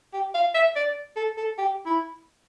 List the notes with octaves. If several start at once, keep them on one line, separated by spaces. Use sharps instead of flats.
G4
F5
E5
D5
A4
A4
G4
E4